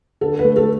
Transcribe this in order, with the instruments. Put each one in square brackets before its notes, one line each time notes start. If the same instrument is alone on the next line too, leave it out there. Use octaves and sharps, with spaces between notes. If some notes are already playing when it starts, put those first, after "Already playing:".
[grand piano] D3 [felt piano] A4
[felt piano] B4
[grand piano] A3
[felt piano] A4